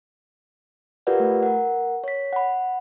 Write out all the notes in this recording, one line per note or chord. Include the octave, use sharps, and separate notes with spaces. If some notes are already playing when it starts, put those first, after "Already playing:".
F4 G4 A#4 B4 D5 F#5
A3
A#4 F#5
C#5 B6
F#5 B5